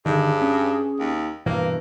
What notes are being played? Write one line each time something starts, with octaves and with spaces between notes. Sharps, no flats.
G2 D3 D#3 G#4
C#4
D#2
G2 B2 E3 A#3 B4